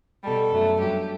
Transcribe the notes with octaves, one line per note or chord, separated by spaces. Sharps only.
B2 G3 A4
F#2 F#3 A3
G2 F#3 A3 G4